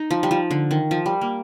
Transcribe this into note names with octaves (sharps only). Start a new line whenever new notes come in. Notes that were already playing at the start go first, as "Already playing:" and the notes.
Already playing: D#4
F3
G3
F3
D3
D#3
F3
G3
A#3